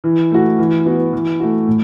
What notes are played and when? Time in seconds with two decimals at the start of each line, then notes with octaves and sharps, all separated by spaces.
0.04 E3
0.32 A3 F#4
0.59 E3
0.85 B3 F#4
1.13 E3
1.40 A3 F#4
1.67 A2